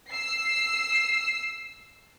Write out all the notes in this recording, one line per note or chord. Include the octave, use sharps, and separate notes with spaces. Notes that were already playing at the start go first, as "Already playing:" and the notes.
E6 C7